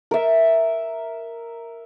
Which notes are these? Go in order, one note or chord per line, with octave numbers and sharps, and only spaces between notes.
A#4 E5